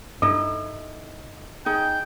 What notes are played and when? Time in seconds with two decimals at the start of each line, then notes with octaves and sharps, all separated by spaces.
0.22 G2 D#4 E4 A4 D#5
1.66 D#4 G#4 G5